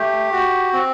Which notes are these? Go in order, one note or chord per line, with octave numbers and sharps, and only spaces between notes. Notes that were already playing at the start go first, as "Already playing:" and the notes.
Already playing: A3 G4
F#4
C4